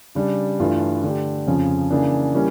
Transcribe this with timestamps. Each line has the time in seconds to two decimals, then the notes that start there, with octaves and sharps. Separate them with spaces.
0.15 C#3 G3 D4 G4
0.59 G2 E3 A3 D4 F4
1.03 D3 A3 D4 G4
1.47 F2 C#3 F3 C#4
1.90 C#3 E3 A#3 D4
2.34 E3 G3 A#3 C#4